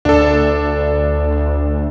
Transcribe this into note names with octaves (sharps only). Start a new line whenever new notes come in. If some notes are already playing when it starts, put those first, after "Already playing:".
D2 D4 A4